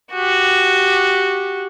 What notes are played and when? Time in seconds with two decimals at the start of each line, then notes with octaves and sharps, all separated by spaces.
0.13 F#4 G4